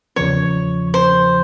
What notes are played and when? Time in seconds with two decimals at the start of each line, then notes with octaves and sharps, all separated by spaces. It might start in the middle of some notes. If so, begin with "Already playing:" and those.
0.16 E2 C#3 F3 C#5
0.94 C5